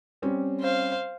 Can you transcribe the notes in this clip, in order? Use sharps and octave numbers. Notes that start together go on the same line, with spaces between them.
G3 C4 C#4
C5 F5